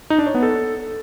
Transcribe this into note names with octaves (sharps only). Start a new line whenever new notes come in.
D#4
D4
C#5
B3
A4